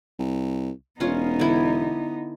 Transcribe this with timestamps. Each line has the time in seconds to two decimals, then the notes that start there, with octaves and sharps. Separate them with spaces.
0.19 C2
1.00 E1 B3 C#4 D#4 F4
1.39 D3 E4